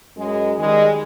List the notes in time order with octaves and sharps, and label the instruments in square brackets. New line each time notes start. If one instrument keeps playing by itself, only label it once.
[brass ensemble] F#2 G#3
D#3 G3 G#3